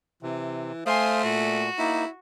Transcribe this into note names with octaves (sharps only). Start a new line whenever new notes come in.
C3 E3
A3 C5 F5 G#5 C6 D#6
A#2 F#4
A#3 D#4 E4